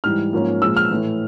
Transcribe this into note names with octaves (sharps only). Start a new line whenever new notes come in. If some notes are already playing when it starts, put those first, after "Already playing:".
G#2 E3 G3 F6
G#2 F3 A#3 C#4
A#2 F3 G#3 E6
F6
A2 E3 A3